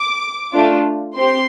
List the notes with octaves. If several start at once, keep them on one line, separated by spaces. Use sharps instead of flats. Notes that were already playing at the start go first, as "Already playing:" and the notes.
Already playing: D6
A3 D4 F4
C4 G4 C6